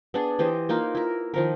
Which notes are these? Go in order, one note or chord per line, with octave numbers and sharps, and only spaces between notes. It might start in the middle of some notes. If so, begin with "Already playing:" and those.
B3 D4 G#4
E3 G4 C5 D#5
A#3 D#4 F4 A#4
E4 A#4
D#3 F3 A#4